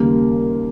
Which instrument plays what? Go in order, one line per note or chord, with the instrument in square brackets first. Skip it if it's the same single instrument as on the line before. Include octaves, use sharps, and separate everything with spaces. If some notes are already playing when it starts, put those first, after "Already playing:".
Already playing: [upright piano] D#2 C#3 G3 [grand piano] A#3